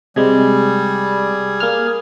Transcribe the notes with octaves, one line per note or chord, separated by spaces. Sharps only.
C3 G3 G#3 G#4
A#3 F6